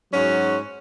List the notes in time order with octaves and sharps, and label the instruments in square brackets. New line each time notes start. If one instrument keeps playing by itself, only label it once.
[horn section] G#2 F#3 C#4 F#4